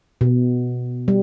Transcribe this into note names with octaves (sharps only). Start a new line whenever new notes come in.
B2
G3